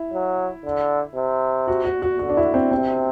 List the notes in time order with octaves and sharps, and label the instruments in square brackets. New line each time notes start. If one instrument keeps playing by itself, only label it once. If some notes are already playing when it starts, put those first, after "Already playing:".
Already playing: [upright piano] E4
[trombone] F#3
D3
C3
[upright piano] F#4
F#4
F#4
[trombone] D3 [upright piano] F#4
[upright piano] D4
E4
C4
[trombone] C3 [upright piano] C4